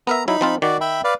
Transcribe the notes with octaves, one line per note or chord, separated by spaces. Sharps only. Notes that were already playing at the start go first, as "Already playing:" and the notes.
B3 A#4 E5 A#5
F#3 D#4 E4 B5
F3 C4 F4
D#3 F#4 D5
E5 G5 B5
B4 D5 F5